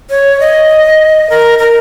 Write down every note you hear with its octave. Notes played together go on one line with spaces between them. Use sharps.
C#5
D#5
A#4
A#4